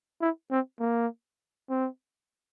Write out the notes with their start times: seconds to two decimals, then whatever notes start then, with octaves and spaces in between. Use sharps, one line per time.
0.21 E4
0.51 C4
0.80 A#3
1.70 C4